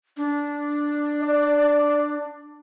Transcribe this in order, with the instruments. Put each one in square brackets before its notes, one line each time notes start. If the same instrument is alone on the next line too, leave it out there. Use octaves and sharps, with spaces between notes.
[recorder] D4
[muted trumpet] D5